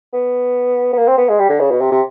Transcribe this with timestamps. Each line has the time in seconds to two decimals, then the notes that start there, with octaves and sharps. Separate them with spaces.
0.13 B3
0.93 B3
0.98 A#3
1.08 C4
1.18 B3
1.29 G#3
1.39 G3
1.49 D3
1.60 C#3
1.71 B2
1.81 C3
1.92 C3